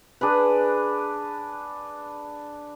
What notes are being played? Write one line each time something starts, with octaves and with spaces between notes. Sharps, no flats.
D4 G#4 B4